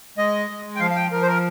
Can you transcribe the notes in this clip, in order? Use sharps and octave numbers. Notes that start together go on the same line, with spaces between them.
G#3 D#5
G#3
G5
F3 F5
F5
G5
F3 A#4
C5
A#4